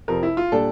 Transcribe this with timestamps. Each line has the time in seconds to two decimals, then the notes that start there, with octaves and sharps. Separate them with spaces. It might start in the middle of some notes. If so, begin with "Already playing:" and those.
0.08 F2 C3 F3 A#4
0.23 E4
0.37 F4
0.52 A#2 G3 D4 A4